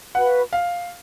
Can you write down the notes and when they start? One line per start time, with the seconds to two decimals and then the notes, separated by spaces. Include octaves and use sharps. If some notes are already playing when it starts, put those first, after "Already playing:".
0.15 F#4 B4 F5 F#5 B5
0.53 F5